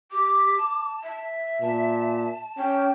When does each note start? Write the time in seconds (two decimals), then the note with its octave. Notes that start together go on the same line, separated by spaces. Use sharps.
0.11 G4 D6
0.57 A5
1.03 E5
1.61 A#2 A5
2.58 C#4 G5